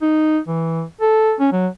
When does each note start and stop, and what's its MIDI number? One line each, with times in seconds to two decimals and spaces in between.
0.02 0.39 63
0.48 0.83 52
1.01 1.34 69
1.40 1.49 61
1.53 1.68 54